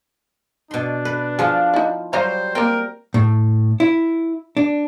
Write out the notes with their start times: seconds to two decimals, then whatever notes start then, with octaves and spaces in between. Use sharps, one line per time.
0.71 B2 D4 C6
1.05 B4
1.39 F3 F4 G#4
1.74 D#4 E4
2.13 F#3 G3 C5 D#5 F5 A#5
2.55 A#3 C4 A#4 G5
3.14 A2
3.80 E4
4.57 D4